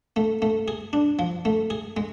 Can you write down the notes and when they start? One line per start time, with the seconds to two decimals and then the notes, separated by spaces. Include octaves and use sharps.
0.16 A3
0.42 A3
0.68 G#4
0.93 D4
1.19 F3
1.45 A3
1.70 G#4
1.97 G#3